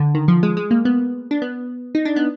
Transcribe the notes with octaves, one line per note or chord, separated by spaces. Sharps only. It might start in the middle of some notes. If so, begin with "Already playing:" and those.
Already playing: D3
D#3
F3
G#3
G#3
A#3
B3
D4
B3
D#4
D4
B3